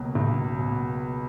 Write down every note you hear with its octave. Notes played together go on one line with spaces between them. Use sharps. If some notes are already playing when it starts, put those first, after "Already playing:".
Already playing: C#2 B2 F#3 A#3
C#2
B2